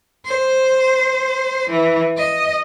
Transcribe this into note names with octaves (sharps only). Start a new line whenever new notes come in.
C5
E3
D#5